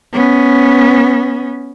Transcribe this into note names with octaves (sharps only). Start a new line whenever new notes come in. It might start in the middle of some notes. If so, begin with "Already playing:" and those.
B3 C#4